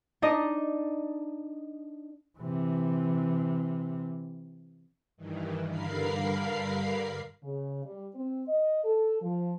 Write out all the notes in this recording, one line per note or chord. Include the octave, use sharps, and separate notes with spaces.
D4 D#4 D#5
C3 E3
G2 D#3 E3
G2 D3 A#4 F5 B5 C7
C#3
G3
C4
D#5
A4
F3